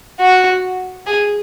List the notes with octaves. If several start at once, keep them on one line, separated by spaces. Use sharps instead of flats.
F#4
G#4